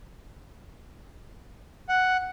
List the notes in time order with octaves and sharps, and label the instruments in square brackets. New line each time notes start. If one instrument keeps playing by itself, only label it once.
[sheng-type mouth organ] F#5